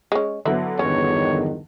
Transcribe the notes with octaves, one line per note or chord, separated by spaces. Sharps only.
G#3 C#4
D3 F#3 B3 E4
G1 E2 D#3 C#4 C#5